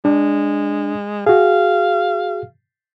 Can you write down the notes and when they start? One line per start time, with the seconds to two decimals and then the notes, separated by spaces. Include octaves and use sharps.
0.05 G#3 D4
1.27 F#4 G#4 F5